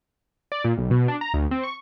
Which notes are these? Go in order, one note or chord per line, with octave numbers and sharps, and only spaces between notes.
D5
A#2
B1
B2
D4
A#5
D2
C4
C#6